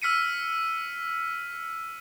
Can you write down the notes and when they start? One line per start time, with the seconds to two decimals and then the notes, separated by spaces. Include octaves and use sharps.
0.02 E6 F6 B6 C#7 D#7